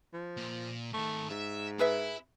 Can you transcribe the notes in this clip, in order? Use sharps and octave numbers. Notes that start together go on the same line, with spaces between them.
F3
A#2
G#2 D#3 A3
G#2 E5
E4 G#4 B4 E5